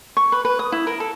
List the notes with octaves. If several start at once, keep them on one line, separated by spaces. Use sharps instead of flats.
C#6
B4
B4
D#6
E4
A#4
A4